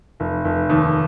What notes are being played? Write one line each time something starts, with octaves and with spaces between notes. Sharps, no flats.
F1
F1
D#2